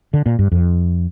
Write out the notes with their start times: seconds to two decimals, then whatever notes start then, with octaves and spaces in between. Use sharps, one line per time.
0.14 D3
0.26 A#2
0.39 G2
0.52 F2